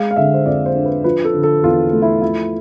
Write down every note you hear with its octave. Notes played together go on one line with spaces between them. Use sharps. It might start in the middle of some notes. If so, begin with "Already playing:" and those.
Already playing: G#3 F5
F5
D3 E5
C5
F2 D5
C5
D4
B4
F3 B4
A4
D3
A4
E2 F4
A3
E4
F3 E4